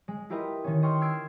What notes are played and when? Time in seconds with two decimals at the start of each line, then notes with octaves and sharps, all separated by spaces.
0.08 G#3
0.30 E4 F4 G4 A#4 B4 D#5
0.64 D#3 C#4
0.82 D#5 G5 C6 C#6 F6
1.01 E6 F6 G#6 C7 D7